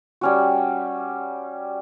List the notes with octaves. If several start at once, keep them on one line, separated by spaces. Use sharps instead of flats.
G3 C#4 F#4